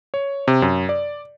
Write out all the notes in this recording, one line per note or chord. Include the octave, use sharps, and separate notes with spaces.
C#5
C3
F#2
D5